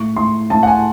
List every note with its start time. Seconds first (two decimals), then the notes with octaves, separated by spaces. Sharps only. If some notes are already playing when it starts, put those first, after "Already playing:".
Already playing: A2 C#6
0.16 A2 C6
0.50 A2 A5
0.63 F#5
0.67 G#5